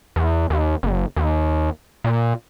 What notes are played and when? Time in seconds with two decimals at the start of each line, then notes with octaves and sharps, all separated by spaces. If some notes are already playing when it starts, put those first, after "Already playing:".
0.16 E2
0.50 D#2
0.83 F#1
1.16 D#2
2.04 A#2